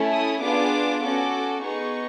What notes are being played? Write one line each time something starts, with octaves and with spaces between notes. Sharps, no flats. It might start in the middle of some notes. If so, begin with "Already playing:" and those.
Already playing: A3 C#4 E4 A4
D#6
B3 D4 F4 G#4 D6
C#4 F#4 A4 D6
B3 D#4 G#4 C#6